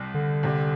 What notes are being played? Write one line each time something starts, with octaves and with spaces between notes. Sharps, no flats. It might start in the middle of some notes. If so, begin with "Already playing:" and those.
Already playing: C2 C3 G3
D3
C2 C3 G3